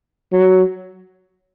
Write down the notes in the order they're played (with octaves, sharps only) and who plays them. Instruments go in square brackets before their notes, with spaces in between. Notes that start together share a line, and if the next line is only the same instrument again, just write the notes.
[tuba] F#3